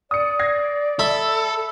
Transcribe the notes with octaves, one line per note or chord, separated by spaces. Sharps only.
D5 D#6 C#7
G#6 A#6 C7
A4 E5 B5